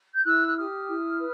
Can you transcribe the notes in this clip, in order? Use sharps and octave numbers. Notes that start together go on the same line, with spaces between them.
G6
E4 E6 F#6
F#6
G4 D#6 F6
E4
B4